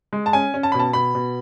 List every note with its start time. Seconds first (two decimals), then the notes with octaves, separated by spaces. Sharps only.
0.13 G#3
0.26 A5
0.33 C#4 G#5
0.54 C#4
0.63 A5
0.72 B2 B5
0.79 A5
0.93 B2 B5
1.15 B2